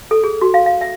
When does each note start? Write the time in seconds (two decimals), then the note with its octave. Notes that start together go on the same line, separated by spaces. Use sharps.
0.11 A4
0.24 G#4
0.41 F#4
0.54 F5
0.66 F5
0.81 E5